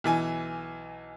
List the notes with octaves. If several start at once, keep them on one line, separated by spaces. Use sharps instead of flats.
B1 E3 G#5